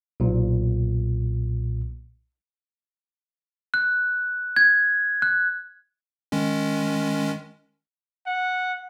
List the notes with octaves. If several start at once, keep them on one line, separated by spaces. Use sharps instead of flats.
B1 A#2
F#6
G#6
F#6
D#3 G#3 C#4
F#5